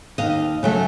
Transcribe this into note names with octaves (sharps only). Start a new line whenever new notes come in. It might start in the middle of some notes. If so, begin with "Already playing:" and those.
D#2 D#5 F5
C#3 F#3 A3